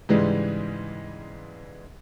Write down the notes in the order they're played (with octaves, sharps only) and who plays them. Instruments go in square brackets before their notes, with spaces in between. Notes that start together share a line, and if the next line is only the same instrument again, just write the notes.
[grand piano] G#2 C#3 E3 G3 G#3